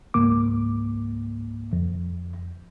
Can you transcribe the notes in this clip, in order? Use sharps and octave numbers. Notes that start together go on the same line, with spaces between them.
C#2 G#2 A#3 D6
F2